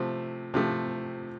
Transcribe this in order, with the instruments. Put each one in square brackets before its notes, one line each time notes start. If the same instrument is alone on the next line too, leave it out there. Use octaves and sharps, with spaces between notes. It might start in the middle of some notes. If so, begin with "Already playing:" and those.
Already playing: [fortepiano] C3 F3 A3
C3 F3 A3